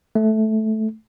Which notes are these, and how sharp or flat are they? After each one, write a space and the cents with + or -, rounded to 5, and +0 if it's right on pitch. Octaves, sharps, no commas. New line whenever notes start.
A3 -10